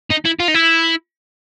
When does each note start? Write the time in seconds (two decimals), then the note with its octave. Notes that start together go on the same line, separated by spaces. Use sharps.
0.10 D#4
0.25 E4
0.39 F4
0.48 D#4
0.54 E4